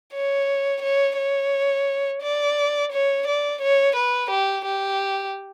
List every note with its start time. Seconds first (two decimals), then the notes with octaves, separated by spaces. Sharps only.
0.14 C#5
0.82 C#5
1.17 C#5
2.23 D5
2.93 C#5
3.27 D5
3.62 C#5
3.96 B4
4.31 G4
4.66 G4